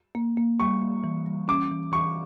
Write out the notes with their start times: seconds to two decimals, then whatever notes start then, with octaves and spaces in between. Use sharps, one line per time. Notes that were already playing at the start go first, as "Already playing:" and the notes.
0.15 A#3
0.37 A#3
0.60 G3 C#6
0.82 A#3
1.04 E3
1.26 G3
1.48 C#4 D6
1.71 E3
1.92 E3 C#6